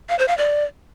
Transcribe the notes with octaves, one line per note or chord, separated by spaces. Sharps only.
F5
C5
F5
D5